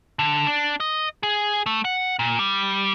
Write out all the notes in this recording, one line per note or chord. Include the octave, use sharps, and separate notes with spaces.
D3
D4
D#5
G#4
A3
F#5
A#2
G3